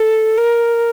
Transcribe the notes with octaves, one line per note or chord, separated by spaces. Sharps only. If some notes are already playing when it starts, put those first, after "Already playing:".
Already playing: A4
A#4